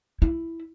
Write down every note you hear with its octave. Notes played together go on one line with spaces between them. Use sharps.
E4